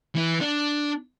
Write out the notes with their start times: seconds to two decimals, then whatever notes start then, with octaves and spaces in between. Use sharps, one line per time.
0.15 E3 E4
0.41 D4